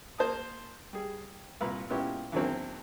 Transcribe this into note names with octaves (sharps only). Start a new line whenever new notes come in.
A#3 C5 A5 D#6
G3 G#4
C2 A#2 B4 A#5
A#2 G#3 B3 C#4 E4 G4
E2 D3 D#3 F#3 A#3 C4